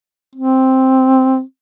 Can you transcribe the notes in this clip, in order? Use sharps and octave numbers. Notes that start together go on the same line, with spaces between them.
C4